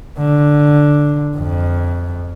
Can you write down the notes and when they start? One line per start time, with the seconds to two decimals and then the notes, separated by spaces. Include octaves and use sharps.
0.19 D3
1.37 F2